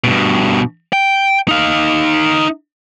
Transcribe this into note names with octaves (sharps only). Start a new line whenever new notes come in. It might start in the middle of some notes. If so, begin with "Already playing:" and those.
G2 B2
G5
D#4 F5